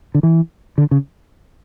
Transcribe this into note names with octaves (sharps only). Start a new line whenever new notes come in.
D3
E3
D3
C#3